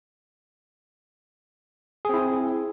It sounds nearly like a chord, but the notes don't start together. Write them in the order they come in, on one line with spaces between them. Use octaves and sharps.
G#4 C4 E4